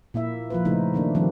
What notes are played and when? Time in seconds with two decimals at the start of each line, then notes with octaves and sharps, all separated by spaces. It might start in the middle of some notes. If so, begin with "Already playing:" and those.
0.14 A#2 A#3 E4 E5
0.50 F3 F4 B4
0.65 C#3 A3 D#4 E4
0.94 D#3 A#3 D4
1.15 D#3 F3 G3 C4